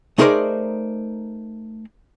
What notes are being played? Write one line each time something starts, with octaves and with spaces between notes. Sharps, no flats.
A3 D#4 G#4 A#4 C5 D5